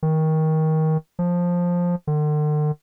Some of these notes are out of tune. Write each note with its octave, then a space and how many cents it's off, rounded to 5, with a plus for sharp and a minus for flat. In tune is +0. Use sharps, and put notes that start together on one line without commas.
D#3 +20
F3 +10
D3 +45